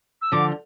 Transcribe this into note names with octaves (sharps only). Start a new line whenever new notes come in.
E6
D3 F3 D6